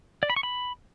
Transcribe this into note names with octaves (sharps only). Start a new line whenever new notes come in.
D5
B5
C#6
B5